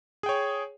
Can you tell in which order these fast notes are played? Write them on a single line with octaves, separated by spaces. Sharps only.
G#4 G5 C#5